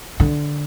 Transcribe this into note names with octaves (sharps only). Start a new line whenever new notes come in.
D3